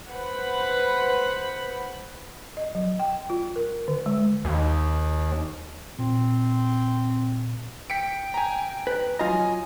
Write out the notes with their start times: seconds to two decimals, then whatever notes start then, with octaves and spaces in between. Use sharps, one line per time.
0.11 B4 C5 F#5 B5
2.57 D#5
2.75 F#3
2.99 G5
3.30 F4
3.56 A#4
3.88 D3
4.06 G#3
4.45 D#2
5.99 A#2 C4
7.90 G5 B6 C#7 D7
8.34 G#5 A#5
8.87 B4
9.19 F#3 F4 D#5 G#5 A#5